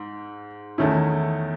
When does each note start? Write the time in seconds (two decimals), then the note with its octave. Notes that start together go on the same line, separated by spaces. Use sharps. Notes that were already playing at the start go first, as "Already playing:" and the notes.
Already playing: G#2
0.78 E2 D#3 A3 C#4 E4